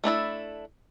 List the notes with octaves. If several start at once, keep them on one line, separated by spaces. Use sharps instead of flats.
A3 D4 E4 A4